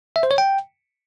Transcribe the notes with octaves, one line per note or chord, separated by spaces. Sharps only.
E5
C5
C#5
G5